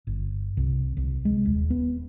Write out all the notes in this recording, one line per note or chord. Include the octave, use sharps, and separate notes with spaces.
G1
C2
C2
G#3
D#1
B3